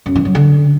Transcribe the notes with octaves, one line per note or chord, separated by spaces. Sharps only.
F#2
E3
F#3
D3